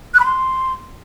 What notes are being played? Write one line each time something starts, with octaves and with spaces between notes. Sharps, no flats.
F#6
B5
C6